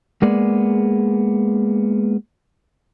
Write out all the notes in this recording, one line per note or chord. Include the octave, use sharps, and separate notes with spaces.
G#3 A#3 B3 G#4 D5